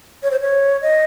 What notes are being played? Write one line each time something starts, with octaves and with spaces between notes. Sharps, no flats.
C#5
C5
C#5
D#5